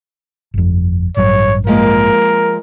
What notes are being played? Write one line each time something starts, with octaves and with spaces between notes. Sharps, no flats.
G1 F2
A1 G2 F#3 C#5
F3 G#3 A#3 A#4